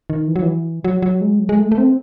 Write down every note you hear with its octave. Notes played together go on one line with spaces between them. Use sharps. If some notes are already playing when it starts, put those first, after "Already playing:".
D#3
E3
F#3
E3
F#3
F#3
G#3
F#3
G#3
A3
A3
C4